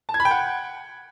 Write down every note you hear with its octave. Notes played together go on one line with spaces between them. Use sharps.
A5
G#6
B5
G5
F#5